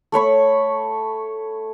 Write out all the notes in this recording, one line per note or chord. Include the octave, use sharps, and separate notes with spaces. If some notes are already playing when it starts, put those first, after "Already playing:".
A3 C#5 B5 C#6